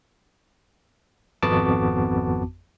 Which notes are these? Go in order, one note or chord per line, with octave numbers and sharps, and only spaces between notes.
G#1 F2 B3 F#4 A5 D6